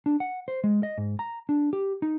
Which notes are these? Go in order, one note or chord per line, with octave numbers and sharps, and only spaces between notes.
D4
F#5
C5
G#3
D#5
G#2
A#5
D4
G4
D#4